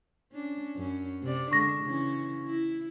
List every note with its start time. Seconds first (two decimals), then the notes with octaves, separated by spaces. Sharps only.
0.32 C#4 D4
0.77 F#2 C#4
1.23 C3 D5
1.52 D3 G#3 D4 C#6 A#6
1.85 C#3 E3 C#4
2.46 E4